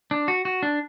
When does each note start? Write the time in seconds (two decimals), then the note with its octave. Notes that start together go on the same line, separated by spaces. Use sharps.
0.11 D4
0.28 F#4
0.45 F#4
0.63 D4